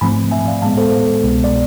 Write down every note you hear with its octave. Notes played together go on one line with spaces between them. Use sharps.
G#2 F3 A3 C4 G#5 B5
E5 G#5
D5 F5
A2 G#3 B3 F5 A5
A4 C5
C2 B2 G#3 B3
D5